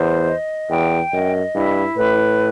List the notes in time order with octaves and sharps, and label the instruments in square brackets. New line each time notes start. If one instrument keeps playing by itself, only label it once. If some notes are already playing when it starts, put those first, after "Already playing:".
Already playing: [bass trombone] E2 [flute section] C5
[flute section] D#5
[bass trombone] E2 [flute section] G5
[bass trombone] F#2 [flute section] D#5
[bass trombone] G2 [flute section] E4
[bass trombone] A2 [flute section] B4